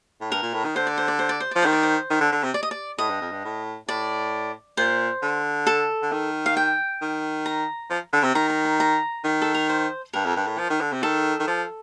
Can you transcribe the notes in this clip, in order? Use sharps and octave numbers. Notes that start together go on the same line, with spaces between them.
A2
G2 A#4
A#2
A2
D#3
D3 C5
D5
C5
D5
C5
D5
C5
F3 D5
D#3 C5
D5
C5
D#3
D3
D3
C3
D5
D#5
D5
A2 D#5
G2
F2
G2
A2
A2 D5
A#2 C5
D3
A4
D3
D#3
F5
G5
D#3
A#5
F3
D3
C3
D#3 A#5
A#5
A#5
A#5
D#3
A4
A#4
C5
G2 A#4
F2
G2
A2
F3
D#3
D3
C3
D#3 A4
D#3
F3